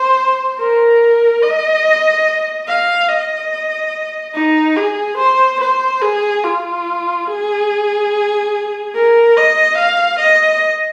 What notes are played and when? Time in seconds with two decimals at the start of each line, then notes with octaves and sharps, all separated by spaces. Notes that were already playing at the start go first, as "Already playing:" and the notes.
Already playing: C5
0.59 A#4
1.42 D#5
2.68 F5
3.09 D#5
4.34 D#4
4.77 G#4
5.18 C5
5.61 C5
6.02 G#4
6.44 F4
7.27 G#4
8.95 A#4
9.36 D#5
9.78 F5
10.20 D#5